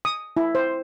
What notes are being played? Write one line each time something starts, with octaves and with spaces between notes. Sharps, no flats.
D#6
E4
C5